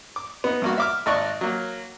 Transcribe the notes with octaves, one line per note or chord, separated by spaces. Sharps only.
D6
B3 D#4
G2 A#3 F#4
E5 D6 F6
G#1 D5 D#5 C#6 F#6
F#3 A#3